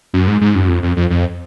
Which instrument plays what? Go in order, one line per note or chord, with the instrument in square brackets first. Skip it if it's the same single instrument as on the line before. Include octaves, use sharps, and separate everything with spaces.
[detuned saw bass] F#2
G#2
G#2
F#2
F2
F2
F2
F2